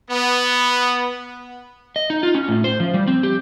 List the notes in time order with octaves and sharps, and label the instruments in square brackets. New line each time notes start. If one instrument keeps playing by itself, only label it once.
[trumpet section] B3
[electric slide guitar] D#5
D#4
F4
C#4
A2
C5
F3
G3
C4
G4